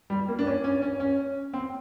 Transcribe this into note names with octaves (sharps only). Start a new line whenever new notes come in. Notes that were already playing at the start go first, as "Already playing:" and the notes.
G3
A#3
D4
C#4
C#4
C#4
C#4
C4